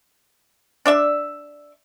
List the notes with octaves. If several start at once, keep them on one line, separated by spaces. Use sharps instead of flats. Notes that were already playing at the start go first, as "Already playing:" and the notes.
D4 D5 E5